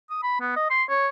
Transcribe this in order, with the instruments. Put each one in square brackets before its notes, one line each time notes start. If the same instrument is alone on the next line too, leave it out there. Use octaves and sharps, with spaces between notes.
[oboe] D#6
B5
B3
D#5
C6
C#5